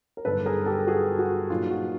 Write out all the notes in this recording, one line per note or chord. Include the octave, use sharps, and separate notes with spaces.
A#4
G2 D3 F#3 B3 D#4 A4 B4
G#4 A#4
G4 A4
F#4 G#4
F#4
A#2 F#3 A#3 D#4 F4
F#4